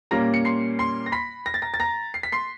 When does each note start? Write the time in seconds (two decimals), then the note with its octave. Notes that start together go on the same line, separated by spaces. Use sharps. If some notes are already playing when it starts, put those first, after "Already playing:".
0.11 A#2 G3 A#3 C#4 A#5 A#6
0.34 C#7
0.45 C6 C7
0.79 C6 C7
1.06 A#6
1.12 B5 B6
1.46 A#6
1.54 A6
1.62 A#5 A#6
1.74 A6
1.80 A#5 A#6
2.14 C7
2.23 B6
2.32 C6 C7